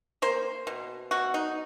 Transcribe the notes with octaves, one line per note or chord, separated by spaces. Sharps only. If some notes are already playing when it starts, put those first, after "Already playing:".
A#3 C5
B2
B2 F#4
D#4